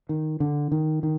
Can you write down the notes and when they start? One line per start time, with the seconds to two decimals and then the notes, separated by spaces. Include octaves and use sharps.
0.09 D#3
0.40 D3
0.72 D#3
1.03 D#3